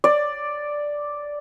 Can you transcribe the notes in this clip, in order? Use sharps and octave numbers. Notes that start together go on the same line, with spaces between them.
D5